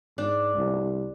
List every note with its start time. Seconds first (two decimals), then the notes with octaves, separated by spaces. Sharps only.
0.18 G#2 D4
0.55 C2